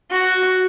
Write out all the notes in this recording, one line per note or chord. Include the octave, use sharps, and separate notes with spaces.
F#4